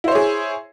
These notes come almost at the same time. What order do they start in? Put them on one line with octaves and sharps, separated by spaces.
E4 C5 C#5 G#4